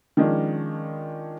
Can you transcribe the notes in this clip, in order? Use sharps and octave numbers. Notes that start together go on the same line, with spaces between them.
D#3 F3 G#3 C#4 D4